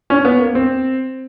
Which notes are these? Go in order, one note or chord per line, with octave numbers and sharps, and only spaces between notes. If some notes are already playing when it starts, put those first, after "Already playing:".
C#4
B3
A#3
C4